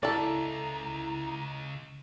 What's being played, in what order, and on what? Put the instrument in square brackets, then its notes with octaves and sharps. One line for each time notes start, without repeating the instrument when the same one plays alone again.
[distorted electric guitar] C#2 [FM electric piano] E4 [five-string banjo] A4 D5 [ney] A#5